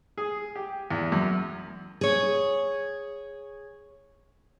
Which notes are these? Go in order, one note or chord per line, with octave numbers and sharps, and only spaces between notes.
G#4
G4
E2
F#2
G#4 C#5